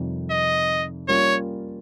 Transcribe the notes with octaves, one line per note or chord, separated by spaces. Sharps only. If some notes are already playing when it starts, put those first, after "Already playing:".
Already playing: F2 C3 D#3 G3 C4
D#5
G3 A#3 C#4 F4 C#5